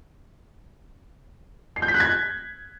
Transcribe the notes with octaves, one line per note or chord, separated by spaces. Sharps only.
C7
G6
B6
F#6
G#6